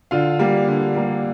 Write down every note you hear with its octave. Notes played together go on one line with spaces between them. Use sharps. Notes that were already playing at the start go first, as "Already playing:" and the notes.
D3 F4 F5
G3 A#3
D3
G3 A#3